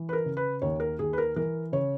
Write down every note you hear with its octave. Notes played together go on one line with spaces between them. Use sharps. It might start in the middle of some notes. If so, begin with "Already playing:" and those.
Already playing: E3
B4
A#4
C#3
B4
D#2 C#5
A#4
D#2 G#4
B4
A#4
E3 A#4
C#3 C#5